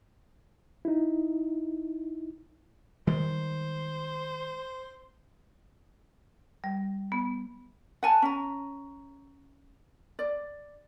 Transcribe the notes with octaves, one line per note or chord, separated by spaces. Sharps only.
D#4 E4
D#3 G3 G#3 C5
G3
B3
F#5 G#5 A5
C#4 A#5
D5